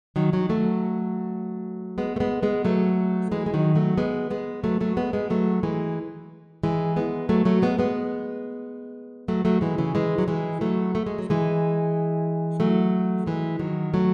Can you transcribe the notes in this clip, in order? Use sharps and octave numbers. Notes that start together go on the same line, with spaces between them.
D#3 F#3
D#3 F#3
F#3 A3
G#3 B3
A3
G#3 B3
G#3 B3
F#3 A3
E3 G#3
G#3
D#3 F#3
F#3 A3
G#3 B3
G#3 B3
F#3 A3
F#3 A3
G#3 B3
G#3 B3
F#3 A3
E3 G#3
E3 G#3
G#3 B3
F#3 A3
F#3 A3
G#3 B3
G#3 B3
F#3 A3
F#3 A3
E3 G#3
C#3 E3
E3 G#3
F#3
E3 G#3
F#3 A3
A3
G#3
F#3
E3 G#3
F#3 A3
E3 G#3
D#3 F#3
F#3 A3